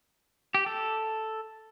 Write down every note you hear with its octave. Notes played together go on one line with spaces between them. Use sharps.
G4
A4